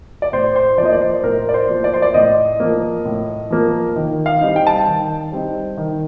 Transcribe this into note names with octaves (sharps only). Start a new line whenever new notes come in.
D5
A2 C5
C5
F3 A#3 D5 D#5
D5
C5
A2 A#4
D5
C5
F3 A#3
D5
C5
D5
A2 D#5
F3 A#3
A2
F3 A#3
D#3
F5
G3 C4 D#4
G5
A5
G5
D#3
G3 C4 D#4
D#3